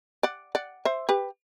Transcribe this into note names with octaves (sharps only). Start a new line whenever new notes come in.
D5 F#5
D5 F#5
C5 E5
G4 B4